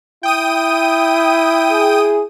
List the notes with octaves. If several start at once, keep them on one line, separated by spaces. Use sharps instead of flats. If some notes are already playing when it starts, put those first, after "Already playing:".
E4 G5 D#6 D#7
G#4